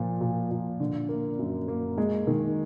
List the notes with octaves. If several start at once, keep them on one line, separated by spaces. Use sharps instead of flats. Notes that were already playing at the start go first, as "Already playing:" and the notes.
Already playing: A#2 F3
A#2
A#2
D3
A#3
F#2
A#3
G#3
D#3